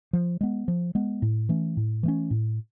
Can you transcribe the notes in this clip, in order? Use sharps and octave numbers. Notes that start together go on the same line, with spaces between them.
F3
G#3 B3
F3
G#3 B3
A2
E3 A3 C#4
A2
E3 A3 C#4
A2